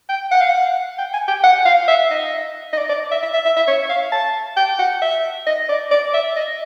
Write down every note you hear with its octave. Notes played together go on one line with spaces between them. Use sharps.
G5
F#5
F5
F#5
G5
G#5
G5
F#5
F5
E5
D#5
D#5
D5
D5
E5
E5
E5
E5
E5
C#5
F5
A5
G5
F#5
E5
D#5
D5
D5
E5
D#5